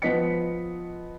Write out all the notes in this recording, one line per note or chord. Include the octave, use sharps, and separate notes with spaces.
F3 B3 B4 D#5 B6 C#7